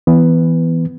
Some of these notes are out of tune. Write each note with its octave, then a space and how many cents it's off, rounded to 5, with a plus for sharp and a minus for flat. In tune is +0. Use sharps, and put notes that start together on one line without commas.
E3 +0 B3 +10